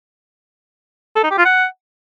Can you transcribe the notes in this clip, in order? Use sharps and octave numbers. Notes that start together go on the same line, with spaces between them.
A4
D#4
G4
F4
F#5